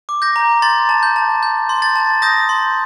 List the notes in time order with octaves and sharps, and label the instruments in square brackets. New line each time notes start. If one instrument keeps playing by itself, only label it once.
[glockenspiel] D6
G6 A#6
A#5
C6 A6
A5
G6
A5
G6
C6
A6
A5
D#6 G6 A#6
C6